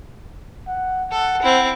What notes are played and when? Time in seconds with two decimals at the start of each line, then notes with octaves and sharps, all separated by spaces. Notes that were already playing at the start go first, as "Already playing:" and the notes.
0.68 F#5
1.12 A4 F#5
1.42 C4 E4